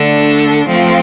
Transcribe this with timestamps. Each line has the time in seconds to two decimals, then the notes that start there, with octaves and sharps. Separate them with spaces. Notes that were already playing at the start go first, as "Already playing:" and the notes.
Already playing: D3 A3 D4 A4
0.67 F3 A3 C4 F4